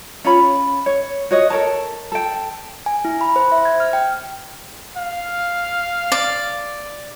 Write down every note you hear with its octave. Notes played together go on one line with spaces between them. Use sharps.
C#4 F4 C#5 B5
C#5
F#4 C#5 D#5
A4 A#4 C#5 A5
A4 G5
G#5
E4
B5
C5
E5
G#6
F6
G5
F5
D5